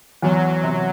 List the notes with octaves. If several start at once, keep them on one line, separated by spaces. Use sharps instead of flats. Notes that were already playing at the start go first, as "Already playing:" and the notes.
E2 F#3
C3